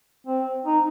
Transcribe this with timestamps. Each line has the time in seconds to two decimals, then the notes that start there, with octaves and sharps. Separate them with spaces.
0.27 C4
0.65 D#4